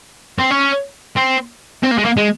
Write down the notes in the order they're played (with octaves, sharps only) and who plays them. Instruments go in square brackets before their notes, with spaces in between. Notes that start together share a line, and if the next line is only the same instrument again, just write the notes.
[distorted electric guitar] C4
C#4
C4
C4
A#3
G#3
A#3
G#3